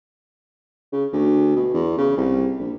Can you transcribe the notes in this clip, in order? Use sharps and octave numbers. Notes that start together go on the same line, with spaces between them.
C#3
D2
B2
E2
C#3
C2
A#1